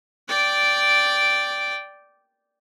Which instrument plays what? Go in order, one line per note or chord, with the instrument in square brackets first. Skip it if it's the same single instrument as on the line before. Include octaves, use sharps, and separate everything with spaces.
[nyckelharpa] D5 G5